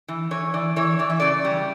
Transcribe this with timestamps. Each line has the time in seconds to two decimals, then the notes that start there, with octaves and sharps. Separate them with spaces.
0.08 E3
0.31 E3 C#5
0.54 E3 D5
0.76 E3 C#5
0.99 E3 D5
1.10 E5
1.20 C#3 D5
1.45 G3